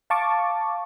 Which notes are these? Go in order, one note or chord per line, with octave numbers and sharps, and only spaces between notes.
F5 A5 C#6 D6